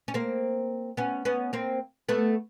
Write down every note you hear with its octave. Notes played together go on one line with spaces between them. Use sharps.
C#4
A#3 C4
B3 C#4
B3 C#4
A#3 C4
A3 B3